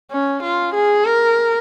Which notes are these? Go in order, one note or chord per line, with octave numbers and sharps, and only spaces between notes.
C#4
F4
G#4
A#4